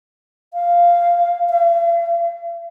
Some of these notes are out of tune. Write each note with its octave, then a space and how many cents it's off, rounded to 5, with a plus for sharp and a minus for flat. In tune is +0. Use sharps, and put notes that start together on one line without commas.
F5 -10
F5 -45